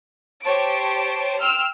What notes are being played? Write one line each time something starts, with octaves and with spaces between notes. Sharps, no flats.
G4 C5 C#5 A5 D7
G5 C6 E6 F6